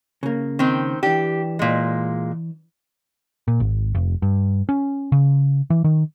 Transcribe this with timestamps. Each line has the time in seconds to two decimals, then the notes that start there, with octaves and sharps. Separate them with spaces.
0.23 C#3 A#3
0.59 D#3 C4
1.03 E3 D4 G4
1.59 A#2 G#3
3.48 A#2
3.60 G#1
3.95 F1
4.22 G2
4.69 C#4
5.12 C#3
5.70 E3
5.84 D#3